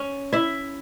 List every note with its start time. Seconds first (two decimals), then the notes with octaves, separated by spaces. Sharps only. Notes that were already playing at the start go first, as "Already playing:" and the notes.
Already playing: C#4
0.33 E4 E5